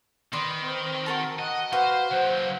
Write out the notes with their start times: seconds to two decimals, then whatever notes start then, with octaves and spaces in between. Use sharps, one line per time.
0.33 D#3 B4 D5 C6
0.63 C4
1.06 F#4 A#4 A5
1.39 D#5 F#5
1.73 F#4 B4 C5 F5
2.11 C#3 F#3 C5 F#5